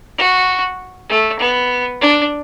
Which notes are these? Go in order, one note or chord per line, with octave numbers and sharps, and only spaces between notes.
F#4
A3
B3
D4